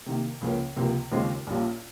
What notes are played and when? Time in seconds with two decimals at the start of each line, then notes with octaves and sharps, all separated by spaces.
0.06 C3 D#3 A#3
0.41 C#2 C#3 F3 A#3 C#4
0.76 C#2 C3 F3 A#3
1.12 D#2 C#3 G#3 C4 F4
1.47 A#1 A#2 G3 C#4 F4